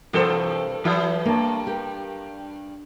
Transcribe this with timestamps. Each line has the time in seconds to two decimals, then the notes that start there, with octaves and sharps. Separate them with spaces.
0.13 G2 C3 E3 A4 A#4 C5
0.85 E3 F#3 E4 B4
1.25 G2 A#3 A5
1.67 G4 A#4